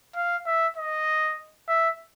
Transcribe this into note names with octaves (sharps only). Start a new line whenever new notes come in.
F5
E5
D#5
E5